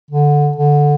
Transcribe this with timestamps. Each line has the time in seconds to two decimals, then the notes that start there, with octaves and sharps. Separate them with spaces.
0.10 D3
0.56 D3